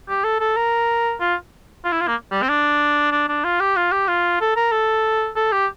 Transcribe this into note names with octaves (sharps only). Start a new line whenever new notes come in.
G4
A4
A4
A#4
F4
F4
E4
F4
A#3
G3
C4
D4
D4
D4
F4
G4
F4
G4
F4
A4
A#4
A4
A4
G4